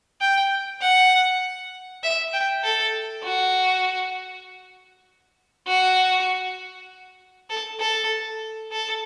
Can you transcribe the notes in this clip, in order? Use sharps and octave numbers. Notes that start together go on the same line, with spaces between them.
G5
F#5
E5
G5
A4
F#4
F#4
A4
A4
A4